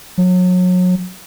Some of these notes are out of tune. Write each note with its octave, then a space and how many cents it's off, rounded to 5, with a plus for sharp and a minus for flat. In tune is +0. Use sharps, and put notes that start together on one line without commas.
F#3 -30